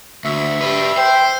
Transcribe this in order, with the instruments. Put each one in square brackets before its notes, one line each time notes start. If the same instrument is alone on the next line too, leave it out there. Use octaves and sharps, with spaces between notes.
[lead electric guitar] D2 [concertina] E5
[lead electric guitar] G4 B4
[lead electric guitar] C5 [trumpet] G5